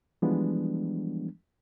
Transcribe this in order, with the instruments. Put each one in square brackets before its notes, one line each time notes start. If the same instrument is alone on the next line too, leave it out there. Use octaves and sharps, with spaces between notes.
[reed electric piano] E3 F3 G3 G#3 B3 D4